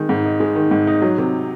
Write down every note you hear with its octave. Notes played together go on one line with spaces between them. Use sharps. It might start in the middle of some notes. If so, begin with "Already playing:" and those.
Already playing: D#3 G#3
G#2
D#4
G#3
D#3
G#2
D#4
F#3
C3